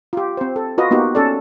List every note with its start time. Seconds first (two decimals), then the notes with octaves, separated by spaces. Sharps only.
0.13 F4 G4
0.37 C4 C5
0.56 A4
0.78 F4 F#4 B4 D#5
0.91 A#3 B3 D#4 F#4 G4
1.15 C#4 A4 D5